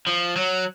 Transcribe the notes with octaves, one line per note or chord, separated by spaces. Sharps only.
F3
F#3